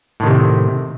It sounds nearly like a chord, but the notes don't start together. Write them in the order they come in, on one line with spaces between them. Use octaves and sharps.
A2 D#3 C3